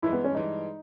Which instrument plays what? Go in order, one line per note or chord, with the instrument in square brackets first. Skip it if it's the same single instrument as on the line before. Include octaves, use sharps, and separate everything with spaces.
[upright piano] G2 E3 G#3 [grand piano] E4
[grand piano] B3
C#4
[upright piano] G2 E3 G#3 [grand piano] D#4